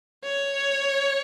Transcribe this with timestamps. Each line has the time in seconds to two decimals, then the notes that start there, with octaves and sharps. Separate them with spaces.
0.24 C#5